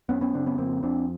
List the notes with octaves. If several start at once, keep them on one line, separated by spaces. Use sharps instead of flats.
F#2 B3 C#4
B3 C#4
C#3 C4 D4
B3 C#4
F2 A#3 C4
F2 C4 D4